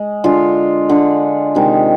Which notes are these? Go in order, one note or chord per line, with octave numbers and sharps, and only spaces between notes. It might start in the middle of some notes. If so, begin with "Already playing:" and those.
Already playing: G#3
D3 G#3 F4
D3 G#3
C3 D#3 G#3